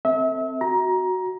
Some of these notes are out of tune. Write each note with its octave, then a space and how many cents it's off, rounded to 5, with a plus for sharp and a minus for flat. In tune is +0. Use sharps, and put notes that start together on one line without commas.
C4 +0 A4 +25 E5 -35
F#4 +0 A#5 +20